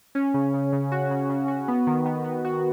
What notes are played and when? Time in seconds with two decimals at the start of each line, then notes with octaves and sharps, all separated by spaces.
0.15 C#4
0.34 C#3
0.54 C#3
0.72 C#3
0.92 F#4
1.11 C#3
1.30 C#3
1.48 F#4
1.68 B3
1.87 D#3
2.06 B3
2.24 B3
2.45 F#4